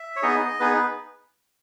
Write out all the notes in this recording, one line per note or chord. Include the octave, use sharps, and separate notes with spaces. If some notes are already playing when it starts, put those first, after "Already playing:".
Already playing: E5
C#5
B3 D#4 G#4 D#5
B3 D#4 G#4 B4